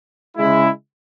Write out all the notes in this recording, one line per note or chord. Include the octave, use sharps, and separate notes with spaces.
C#3 G#3 E4